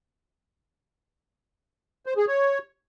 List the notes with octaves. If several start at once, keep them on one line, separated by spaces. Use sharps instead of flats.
C5
G#4
C#5